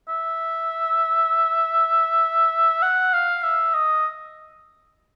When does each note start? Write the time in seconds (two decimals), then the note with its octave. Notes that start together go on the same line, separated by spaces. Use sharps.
0.08 E5
2.82 F#5
3.13 F5
3.43 E5
3.74 D#5